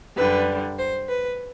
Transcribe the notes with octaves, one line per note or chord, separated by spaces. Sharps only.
F#2 D3 G3 B4
C5
B4